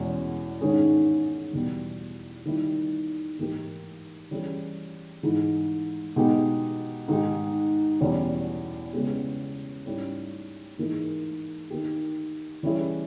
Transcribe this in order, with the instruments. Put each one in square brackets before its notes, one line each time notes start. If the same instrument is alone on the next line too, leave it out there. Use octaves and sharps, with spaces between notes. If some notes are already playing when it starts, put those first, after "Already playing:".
Already playing: [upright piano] E2 B2 G#3 C#4
G#2 D#3 G#3 C#4 G#4
E2 B2 G3
D#3 G3 A#3 E4
G#2 E3 A#3 D#4 G4
E3 G3 C#4 G#4
G#2 E3 G#3 D#4
B2 G#3 D#4 G4
G#2 D#3 G#3 D#4 G4
E2 B2 G3 C#4 G4
C#3 G#3 B3 G4
G#2 G3 C#4 E4
G#2 E3 A#3 D#4 G#4
D#3 A#3 D#4 G4
E3 G3 C#4 E4 G#4